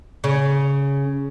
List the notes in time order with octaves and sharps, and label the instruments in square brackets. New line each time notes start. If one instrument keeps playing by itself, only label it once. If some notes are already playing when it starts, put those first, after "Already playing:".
[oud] C#3